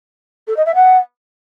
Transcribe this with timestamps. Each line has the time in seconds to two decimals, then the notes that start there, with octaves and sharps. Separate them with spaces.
0.47 A4
0.57 D#5
0.66 E5
0.75 F#5